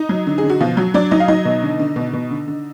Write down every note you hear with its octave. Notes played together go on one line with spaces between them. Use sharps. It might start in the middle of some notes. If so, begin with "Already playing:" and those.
Already playing: D#4
F#3
D3
G#4
D3
F#4
B2 F3 F4
F#3 F#4
F#3 D4 D5
F#3 D#4 D#5
F5
F#3 D#4 D#5
B2
D3
D3
B2
B2
D3
D3